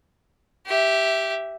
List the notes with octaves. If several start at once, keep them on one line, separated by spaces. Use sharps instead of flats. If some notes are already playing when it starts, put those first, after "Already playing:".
G4 E5